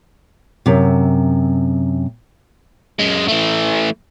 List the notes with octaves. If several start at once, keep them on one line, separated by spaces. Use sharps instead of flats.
F#2 C3
F#2 G#3
E3 A3